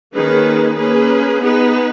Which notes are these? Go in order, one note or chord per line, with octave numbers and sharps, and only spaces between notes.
D#3 A#3 C#4 G#4 B4
A#3 C#4 G#4 B4
B3 D#4 G#4 B4